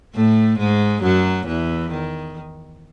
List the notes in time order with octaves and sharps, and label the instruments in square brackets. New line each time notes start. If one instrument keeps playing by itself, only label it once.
[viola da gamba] A2 A3
G#2 G#3
F#2 F#3
E2 E3
D#3